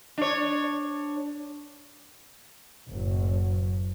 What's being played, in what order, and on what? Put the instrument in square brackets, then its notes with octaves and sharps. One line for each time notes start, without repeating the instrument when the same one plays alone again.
[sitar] D4 C#5
[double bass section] F#1 A2 F#3